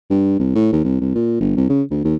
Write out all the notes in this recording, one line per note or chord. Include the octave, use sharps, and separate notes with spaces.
G2
C2
A2
D#2
C2
C2
A#2
G1
C2
C#3
D2
D#2